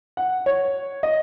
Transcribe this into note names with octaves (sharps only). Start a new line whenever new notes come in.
F#5
C#5
D#5